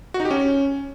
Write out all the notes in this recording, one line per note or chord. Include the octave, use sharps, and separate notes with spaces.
F#4
D#4
G4
C#4